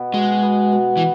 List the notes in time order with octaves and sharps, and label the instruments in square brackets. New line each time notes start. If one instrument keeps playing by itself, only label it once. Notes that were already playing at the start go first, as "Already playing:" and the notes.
Already playing: [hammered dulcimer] B2 B3
[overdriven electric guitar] G#3 [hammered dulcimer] F#4
[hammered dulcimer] B3
B2
[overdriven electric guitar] E3